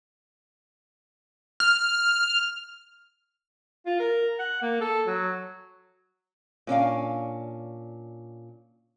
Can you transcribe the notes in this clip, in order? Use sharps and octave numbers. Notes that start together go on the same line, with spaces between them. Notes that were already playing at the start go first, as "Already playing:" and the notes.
F6
F4
A#4
F#5
A#3
A4
F#3
A#2 C#4 D4 F5